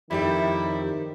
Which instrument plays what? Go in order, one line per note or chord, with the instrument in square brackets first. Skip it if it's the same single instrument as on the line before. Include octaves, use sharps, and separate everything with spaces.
[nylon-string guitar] F2 G4 E5 [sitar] A2 G3 [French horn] D#3 [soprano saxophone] E4